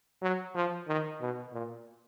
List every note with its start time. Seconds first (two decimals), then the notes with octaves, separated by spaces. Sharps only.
0.22 F#3
0.55 F3
0.88 D#3
1.21 B2
1.53 A#2